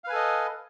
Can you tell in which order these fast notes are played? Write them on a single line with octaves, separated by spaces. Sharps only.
F5 B4 G#5 A4 D#5